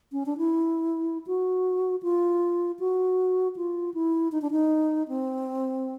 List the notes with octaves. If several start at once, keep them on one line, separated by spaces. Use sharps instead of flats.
C#4
D4
E4
F#4
F4
F#4
F4
E4
D#4
D4
D#4
C4